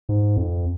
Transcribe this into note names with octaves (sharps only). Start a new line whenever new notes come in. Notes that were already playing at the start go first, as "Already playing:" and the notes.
G#2
F2